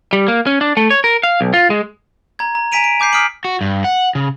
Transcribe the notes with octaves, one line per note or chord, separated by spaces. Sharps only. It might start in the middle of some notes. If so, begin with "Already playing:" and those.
G3
A#3
C#4
D4
A3
C#5
A#4
F5
B1
F4
G#3
A#5 G#6
A#5
G#5 A#5 B6 D7 D#7 F7
D7
G#5 D6 G6 C7
D#6 F6 B6 C7 D7 F#7
F#4
G2
F#5
C#3